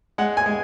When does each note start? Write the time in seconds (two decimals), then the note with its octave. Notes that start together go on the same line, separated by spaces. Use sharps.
0.18 G#3 F#5
0.37 G#5
0.46 G#3